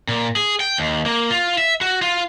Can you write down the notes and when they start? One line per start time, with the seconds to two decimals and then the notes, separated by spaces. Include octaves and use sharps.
0.09 A#2
0.36 G#4
0.60 G5
0.78 D#2
1.06 A#3
1.31 F4
1.58 E5
1.81 F#4
2.02 F4